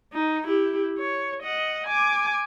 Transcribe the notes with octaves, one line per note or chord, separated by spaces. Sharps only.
D#4
E4 G4
C#5
D#5 F#5
G#5 D6